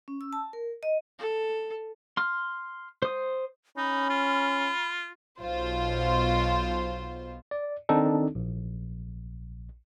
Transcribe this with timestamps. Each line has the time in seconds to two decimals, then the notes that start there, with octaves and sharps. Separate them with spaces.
0.08 C#4
0.21 E6
0.33 A5
0.53 A#4
0.83 D#5
1.19 A4
2.17 C6 F6
3.02 C5 D#6
3.77 C#4 D#4 B5
4.10 F4
5.40 B1 B2 F4 C5
7.51 D5
7.89 D#3 C4 D4 D#4 A4
8.35 A#1